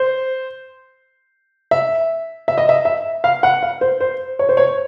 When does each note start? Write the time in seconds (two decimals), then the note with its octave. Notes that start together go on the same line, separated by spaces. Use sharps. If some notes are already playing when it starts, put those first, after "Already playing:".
Already playing: C5
1.71 E5
2.48 E5
2.58 D#5
2.69 E5
2.85 E5
3.24 F5
3.43 F#5
3.63 F5
3.81 C5
4.00 C5
4.39 C#5
4.49 C5
4.57 C#5